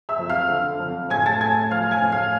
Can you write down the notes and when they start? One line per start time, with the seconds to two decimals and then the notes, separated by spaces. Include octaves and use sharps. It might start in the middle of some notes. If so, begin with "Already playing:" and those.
0.09 E5 E6
0.19 F2
0.29 F5 F6
0.50 D3
0.80 F2
1.10 A2 G#5 G#6
1.26 A5 A6
1.41 A2 G#5 G#6
1.71 F3 F5 F6
1.91 G#5 G#6
2.02 A2
2.12 F5 F6